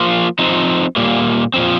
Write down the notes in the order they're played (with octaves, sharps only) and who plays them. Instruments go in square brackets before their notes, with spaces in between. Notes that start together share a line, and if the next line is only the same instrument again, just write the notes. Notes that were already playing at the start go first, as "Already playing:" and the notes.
Already playing: [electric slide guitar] F3 A#3 F4
F3 C4 D#4
A#2 G3 A#3
A#2 F3 C4